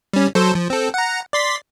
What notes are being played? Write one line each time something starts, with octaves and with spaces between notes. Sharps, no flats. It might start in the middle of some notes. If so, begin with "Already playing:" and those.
G3 C#4
F#3 A4 C5
F3
C4 A4
F#5 A#5
D5 C6 B6